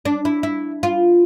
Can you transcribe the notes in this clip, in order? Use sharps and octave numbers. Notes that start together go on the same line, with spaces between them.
D4
E4
E4
F4